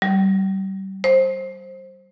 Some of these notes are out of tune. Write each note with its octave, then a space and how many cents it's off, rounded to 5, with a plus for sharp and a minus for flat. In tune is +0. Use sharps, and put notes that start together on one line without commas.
G3 -30
C5 +15